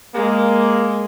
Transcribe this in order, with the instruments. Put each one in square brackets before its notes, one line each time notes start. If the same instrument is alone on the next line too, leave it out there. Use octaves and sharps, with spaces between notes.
[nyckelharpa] G#3 [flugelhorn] A#3